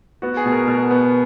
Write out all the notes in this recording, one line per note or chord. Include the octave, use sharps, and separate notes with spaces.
B3 F#4
G#4
B2
A#4
B2 A#4
B3